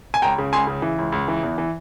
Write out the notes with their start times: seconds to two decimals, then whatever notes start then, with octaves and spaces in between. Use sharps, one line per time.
0.14 G#5
0.22 C#2 G5 A#5
0.38 C#3
0.53 C#2 G#5 C6
0.67 C#3
0.82 E3
0.98 C#2
1.12 C#2
1.28 E3
1.43 E2
1.58 E3